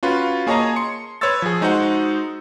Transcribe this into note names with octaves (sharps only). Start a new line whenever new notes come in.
C#4 F4 F#4 B4
A#3 G#4 C#5 D#5 A5 A#5
C6 C#7
B4 C#5 C6 C#6 E6 A6
F3 G#4
G#3 D#4 F#4 C5 F#5